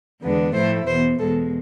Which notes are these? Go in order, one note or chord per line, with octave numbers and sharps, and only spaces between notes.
E2 D3 G#3 B3 D4
A2 F3 A3 E4 C5
E2 B2 B3 C5
E2 B2 G#3 A4